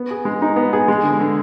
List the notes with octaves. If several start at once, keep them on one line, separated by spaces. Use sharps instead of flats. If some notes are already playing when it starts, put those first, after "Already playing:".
Already playing: B3
G#4
G#3
D#4
B3
G#4
G#3
D3
D3